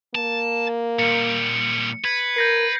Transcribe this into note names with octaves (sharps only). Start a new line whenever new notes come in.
A#3 A5
A#2 G3 C#7
B4 G#6
A#4 G6 A#6 C7